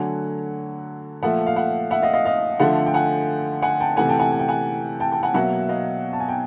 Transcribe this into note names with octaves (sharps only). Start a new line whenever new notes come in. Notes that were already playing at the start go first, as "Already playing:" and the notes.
Already playing: D3 F#3 A3 F#5 G#5
A#2 F3 A3 E5 F#5
F5
E5 F#5
E5 F#5
D#5 F5
D#5 F5
D#5 F5
D3 F3 A3 E5 F#5
G5
F#5 G#5
F#5 G#5
G5 A5
C3 E3 A3 F#5 G#5
G5 A5
F#5 G#5
G#5
G5
F#5 G#5
G5 A5
G5 A5
F#5 G#5
B2 F#3 A#3 E5 F#5
E5
D#5 F5
A5
G#5
G5